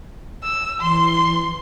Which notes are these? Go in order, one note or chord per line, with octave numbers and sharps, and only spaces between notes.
E6
E3 C6